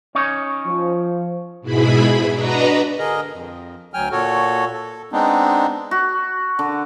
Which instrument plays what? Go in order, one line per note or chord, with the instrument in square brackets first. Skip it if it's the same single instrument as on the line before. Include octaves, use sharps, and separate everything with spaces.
[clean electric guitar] C#4 D#4 C#5
[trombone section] F3
[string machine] G#2 B2 E4 G#4 B5
D4 F#4 B4 D#5 A#5
[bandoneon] D3 G#4 A#4 D#5
F2
D2 F#3 G5 G#5 F6
A#2 F#4 A4 C#5
A4
G#3 B3 C4 D4 D#4
[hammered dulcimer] F#4
D3